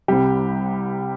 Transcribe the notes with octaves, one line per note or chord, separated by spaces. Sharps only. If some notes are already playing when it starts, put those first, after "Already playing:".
C2 C3 G3 G4